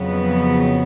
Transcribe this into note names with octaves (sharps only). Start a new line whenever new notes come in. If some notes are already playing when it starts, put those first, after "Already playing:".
Already playing: F2 C#3 F#3 B3